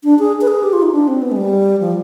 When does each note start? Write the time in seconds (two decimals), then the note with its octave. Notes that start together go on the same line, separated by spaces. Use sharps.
0.04 D4
0.19 G#4
0.41 B4
0.47 G#4
0.63 G4
0.73 F4
0.82 D#4
0.92 D4
1.08 C4
1.22 B3
1.32 G#3
1.36 G3
1.81 F3